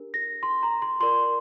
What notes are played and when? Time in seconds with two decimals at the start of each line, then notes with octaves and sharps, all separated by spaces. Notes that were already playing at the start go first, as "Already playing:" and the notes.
Already playing: D4 G4 A#4
0.14 A#6
0.43 C6
0.63 A#5
0.82 C6
1.00 F4 A#4 D5 C6